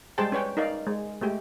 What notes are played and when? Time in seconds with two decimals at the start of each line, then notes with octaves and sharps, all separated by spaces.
0.18 G3 G#3 G#4 C5 G5 A5
0.32 C#4 B4 C#5 G5
0.57 D#4 A#4 D5 F5
0.87 G#3
1.21 G#3 A3 G4